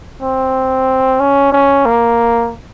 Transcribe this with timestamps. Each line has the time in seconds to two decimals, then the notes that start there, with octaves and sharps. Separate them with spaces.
0.22 C4
1.20 C#4
1.52 C#4
1.86 A#3